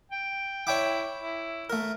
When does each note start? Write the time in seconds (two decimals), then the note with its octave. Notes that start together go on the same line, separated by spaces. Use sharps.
0.12 G5
0.67 E4 C#5 G5 D6
1.18 E4
1.70 A3 A#4